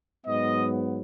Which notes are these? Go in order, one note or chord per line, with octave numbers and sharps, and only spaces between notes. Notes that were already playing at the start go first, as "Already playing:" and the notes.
G#2 F#3 B3 D#5